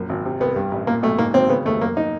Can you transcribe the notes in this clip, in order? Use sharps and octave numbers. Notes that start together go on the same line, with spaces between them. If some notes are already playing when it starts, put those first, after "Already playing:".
Already playing: A#1 F#2
G#1
C3
C2 B3
G2
A1
A#2 A#3
B1 A3
G#2 A#3
G#1 C4
C#3 B3
D#2 A3
F#2 A#3
D#4